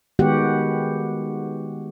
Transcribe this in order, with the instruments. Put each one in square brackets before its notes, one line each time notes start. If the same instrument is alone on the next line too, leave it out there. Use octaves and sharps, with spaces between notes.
[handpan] D#3 G#3 B3 F#4 G4 F#5